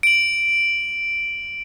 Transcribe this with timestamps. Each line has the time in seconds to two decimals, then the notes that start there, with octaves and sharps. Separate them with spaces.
0.03 D7 F#7